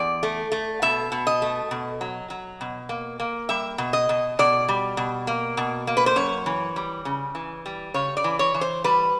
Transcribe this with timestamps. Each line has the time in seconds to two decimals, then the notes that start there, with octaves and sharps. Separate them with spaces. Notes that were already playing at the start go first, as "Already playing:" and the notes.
Already playing: E2 D5
0.23 A3
0.52 A3
0.82 B2 E5
1.12 B2
1.27 D#5
1.42 A3
1.71 B2
2.01 F#3
2.30 F#3
2.61 B2
2.89 A#3
3.20 A#3
3.49 G3 E5
3.78 B2
3.93 D#5
4.09 B2
4.39 B2 D5
4.68 G3
4.97 B2
5.27 A#3
5.57 B2
5.87 A#3
5.97 B4
6.06 C5
6.16 F#2 C#5
6.46 E3
6.76 G3
7.05 C#3
7.35 E3
7.66 G3
7.94 C#3 C#5
8.17 D5
8.24 E3
8.39 C#5
8.54 E3
8.61 C5
8.84 G3 B4